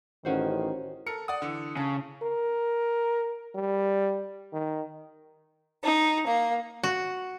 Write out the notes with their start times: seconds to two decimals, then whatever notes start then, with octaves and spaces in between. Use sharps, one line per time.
0.25 A1 D#3 C#4 F#4 C5
1.07 A4 A#4 C#7
1.28 D5 F#5 D#6
1.42 D3 E3
1.77 C#3 A5
2.22 A#4
3.55 G3
4.53 D#3
5.83 D#4
6.26 A#3
6.84 F#4